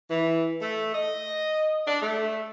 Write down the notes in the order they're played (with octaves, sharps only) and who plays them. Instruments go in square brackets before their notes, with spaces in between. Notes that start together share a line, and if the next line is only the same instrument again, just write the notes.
[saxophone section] E3
A3
D#5
D4
A3